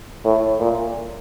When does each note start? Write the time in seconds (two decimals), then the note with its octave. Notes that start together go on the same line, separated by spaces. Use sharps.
0.25 A2
0.60 A#2